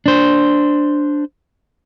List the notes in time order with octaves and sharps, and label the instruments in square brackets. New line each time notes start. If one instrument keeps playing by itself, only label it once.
[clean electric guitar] D4 C5